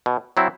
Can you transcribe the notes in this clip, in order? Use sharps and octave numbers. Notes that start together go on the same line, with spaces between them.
B2
F#3 C4 E4